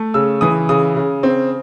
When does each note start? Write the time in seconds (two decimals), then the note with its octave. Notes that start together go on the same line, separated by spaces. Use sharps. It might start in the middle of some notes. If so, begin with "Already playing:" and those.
Already playing: A3
0.14 C#3 E6
0.41 E3 D#6
0.69 C#3 D#6
0.96 C#3
1.23 C4